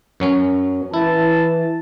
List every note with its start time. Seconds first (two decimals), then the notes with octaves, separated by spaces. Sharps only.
0.20 F#2 F#3 C#4
0.94 E3 E4 A5